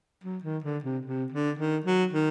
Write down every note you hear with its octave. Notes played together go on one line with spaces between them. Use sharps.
F#3
D#3
D3
C3
C3
D3
D#3
F#3
D#3